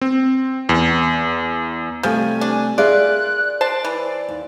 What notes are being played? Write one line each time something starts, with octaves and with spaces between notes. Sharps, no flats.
C4
E2
C3 F3 G3 A3 G#5
D4
F4 G#4 A#4 D5 E5 F#6
C5 D5 A5
E3
D#2